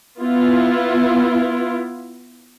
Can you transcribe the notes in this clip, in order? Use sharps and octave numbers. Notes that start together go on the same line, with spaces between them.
B3 E4 F4